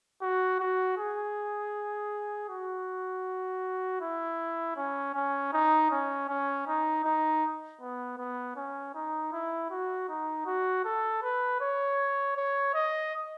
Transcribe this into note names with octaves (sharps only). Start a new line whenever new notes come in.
F#4
F#4
G#4
F#4
E4
C#4
C#4
D#4
C#4
C#4
D#4
D#4
B3
B3
C#4
D#4
E4
F#4
D#4
F#4
A4
B4
C#5
C#5
D#5